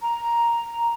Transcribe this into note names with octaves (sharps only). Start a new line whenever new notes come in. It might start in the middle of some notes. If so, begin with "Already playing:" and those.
A#5